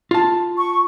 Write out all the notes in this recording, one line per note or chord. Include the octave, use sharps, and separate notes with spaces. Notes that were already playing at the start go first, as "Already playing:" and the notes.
F4 A5
C#6